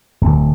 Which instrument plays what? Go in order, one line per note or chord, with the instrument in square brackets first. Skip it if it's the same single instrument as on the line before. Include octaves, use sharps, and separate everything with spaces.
[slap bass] D1